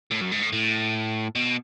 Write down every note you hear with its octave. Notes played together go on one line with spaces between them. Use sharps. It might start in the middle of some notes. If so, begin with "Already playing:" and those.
A2
F#2
G#2
A2
A2
B2